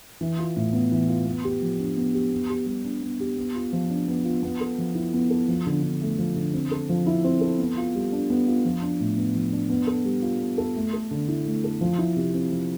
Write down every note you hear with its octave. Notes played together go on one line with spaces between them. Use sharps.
E3
F4
A2
B3
E3
F4
B3
G4
F3
D4
B3
G4
B3
G4
G3
D4
B3
G4
B3
F4
F3
D4
B3
F4
B3
A4
F3
E4
B3
A4
F3
D3
D3
A3
F3
D3
C4
A4
F3
E4
C4
A4
B3
F4
G3
D4
B3
F4
F3
D4
A2
B3
F3
D4
B3
A4
G3
F4
B3
A4
A3
A4
D3
E4
A3
A4
F3
E4
C3
C4
F3